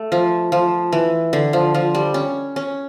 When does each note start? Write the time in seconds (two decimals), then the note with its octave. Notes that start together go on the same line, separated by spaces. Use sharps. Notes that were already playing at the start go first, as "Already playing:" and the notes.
Already playing: A3
0.12 F3
0.52 F3
0.93 E3
1.33 D3
1.53 F3
1.75 F3
1.95 G3
2.14 C#4
2.56 C#4